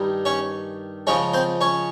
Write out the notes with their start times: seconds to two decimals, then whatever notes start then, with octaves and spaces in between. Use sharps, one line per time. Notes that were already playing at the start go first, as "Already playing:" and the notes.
Already playing: G2 D#3 G3 D#4
0.25 C#4 C#5
1.07 C#3 F3 G#3 C#4 C#5
1.33 C4 C5
1.61 C#4 C#5